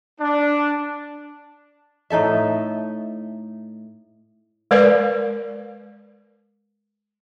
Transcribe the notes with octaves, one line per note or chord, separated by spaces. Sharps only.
D4
A2 D#4 A4 E5
G#3 A#4 B4 D5